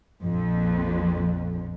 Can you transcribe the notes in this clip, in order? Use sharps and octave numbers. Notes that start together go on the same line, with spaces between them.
A#1 F2